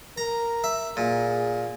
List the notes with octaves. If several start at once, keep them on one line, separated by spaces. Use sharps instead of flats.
A#4 A#5
E5
A#2 G#4